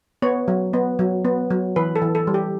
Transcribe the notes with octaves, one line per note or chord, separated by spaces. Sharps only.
B3 C#5
F#3
B3
F#3
B3
F#3
E3 B4
A4
E3
A4
G3
G4